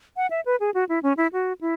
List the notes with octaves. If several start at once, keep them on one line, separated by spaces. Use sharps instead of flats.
F#5
E5
B4
G#4
F#4
E4
C#4
E4
F#4
E4